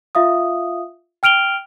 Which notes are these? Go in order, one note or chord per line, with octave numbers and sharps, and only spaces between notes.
F4 E5 F5 D#6
G5 F6 D7 F7 G7